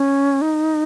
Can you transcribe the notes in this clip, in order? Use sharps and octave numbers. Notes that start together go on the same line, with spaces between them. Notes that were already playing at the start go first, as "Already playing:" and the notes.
Already playing: C#4
D#4